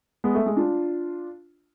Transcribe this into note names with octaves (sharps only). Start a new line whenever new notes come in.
G#3 B3
A3
G#3
D4 F4